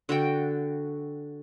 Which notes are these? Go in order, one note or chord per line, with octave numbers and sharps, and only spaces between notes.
D3 F#4 G5